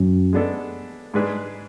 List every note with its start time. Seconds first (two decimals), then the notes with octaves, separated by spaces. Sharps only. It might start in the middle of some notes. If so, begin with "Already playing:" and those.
Already playing: F#2
0.33 G#3 B3 D4 A4
1.14 G#2 G#3 D4 G#4 B4